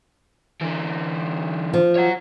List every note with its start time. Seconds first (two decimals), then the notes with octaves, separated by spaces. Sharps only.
0.61 D3 E3
1.73 F3
1.96 C#5 F#5